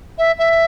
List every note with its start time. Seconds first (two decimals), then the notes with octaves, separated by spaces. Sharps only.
0.18 E5
0.38 E5